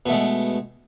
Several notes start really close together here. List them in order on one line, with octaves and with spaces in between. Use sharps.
B2 A3 G#3